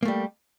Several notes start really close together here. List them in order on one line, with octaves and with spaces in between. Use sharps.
A#3 A3 G3